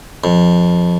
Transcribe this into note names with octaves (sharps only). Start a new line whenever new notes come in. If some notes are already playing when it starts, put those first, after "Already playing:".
F2